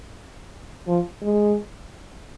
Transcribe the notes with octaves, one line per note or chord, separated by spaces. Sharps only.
F3
G#3